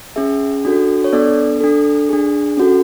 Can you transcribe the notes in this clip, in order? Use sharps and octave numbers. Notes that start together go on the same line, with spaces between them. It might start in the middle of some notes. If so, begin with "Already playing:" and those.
C#4 G#4 E5
D4 F#4 A4
C#5
B3 D4 A4 D5
D4 A4
D4 G#4
C#4 F#4 A4